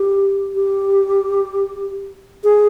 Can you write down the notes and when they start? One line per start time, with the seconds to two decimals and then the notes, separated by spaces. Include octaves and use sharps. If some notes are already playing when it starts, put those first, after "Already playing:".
Already playing: G4
0.55 G4
2.44 G#4